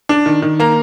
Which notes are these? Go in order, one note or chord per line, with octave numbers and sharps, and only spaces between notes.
D4
D#3
D#3
A#3 A#5